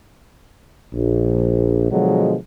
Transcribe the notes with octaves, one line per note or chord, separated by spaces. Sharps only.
A#1
B2 D3 F3 F#3 G#3